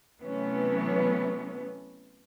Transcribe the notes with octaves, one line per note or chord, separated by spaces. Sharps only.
C3 E3 F#3 A3 B3 C#4